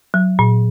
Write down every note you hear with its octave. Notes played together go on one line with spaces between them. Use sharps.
F#3
A#2